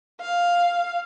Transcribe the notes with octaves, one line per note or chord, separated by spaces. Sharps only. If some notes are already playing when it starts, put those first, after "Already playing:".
F5